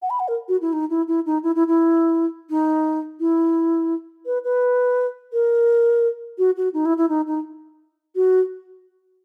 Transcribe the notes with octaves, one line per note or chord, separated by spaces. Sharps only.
F#5
B5
F#5
A#4
F#4
E4
D#4
E4
E4
D#4
E4
E4
E4
D#4
E4
B4
B4
A#4
F#4
F#4
D#4
E4
E4
D#4
D#4
F#4